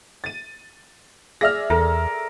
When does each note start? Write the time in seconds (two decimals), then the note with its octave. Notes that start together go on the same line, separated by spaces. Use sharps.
0.24 A6 D#7
1.41 G#4 D5 E5 F6 A#6
1.70 E2 A4 A#4